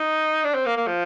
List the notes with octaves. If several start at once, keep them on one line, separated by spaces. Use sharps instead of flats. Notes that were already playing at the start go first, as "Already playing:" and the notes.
Already playing: D#4
D4
C4
A#3
A#3
F3